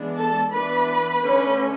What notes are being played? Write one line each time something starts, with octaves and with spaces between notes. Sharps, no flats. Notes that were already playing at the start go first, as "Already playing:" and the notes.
Already playing: E3 G#3 B3 D4
A4 A5
E3 B3 D4 B4 B5
D3 A3 C#4